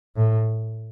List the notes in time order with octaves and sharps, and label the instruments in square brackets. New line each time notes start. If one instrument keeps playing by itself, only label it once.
[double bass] A2